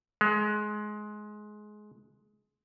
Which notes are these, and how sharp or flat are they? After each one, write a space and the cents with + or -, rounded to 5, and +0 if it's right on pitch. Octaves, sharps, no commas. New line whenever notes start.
G#3 +20